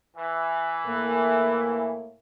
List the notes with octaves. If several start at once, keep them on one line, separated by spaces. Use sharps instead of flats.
E3
A2 A3 A#3